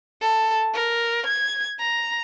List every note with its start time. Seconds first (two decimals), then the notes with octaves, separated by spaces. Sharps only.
0.21 A4
0.74 A#4
1.26 G#6
1.80 A#5